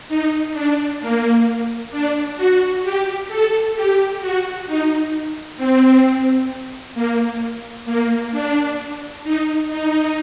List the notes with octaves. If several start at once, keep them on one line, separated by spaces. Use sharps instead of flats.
D#4
D4
A#3
D4
F#4
G4
A4
G4
F#4
D#4
C4
A#3
A#3
D4
D#4
D#4